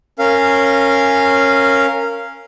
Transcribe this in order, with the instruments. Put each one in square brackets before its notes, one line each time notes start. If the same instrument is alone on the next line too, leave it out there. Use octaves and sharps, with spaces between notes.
[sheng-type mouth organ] C#4 A#4 F5